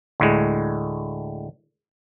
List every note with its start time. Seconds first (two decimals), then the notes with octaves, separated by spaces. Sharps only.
0.20 D2 A2 G#3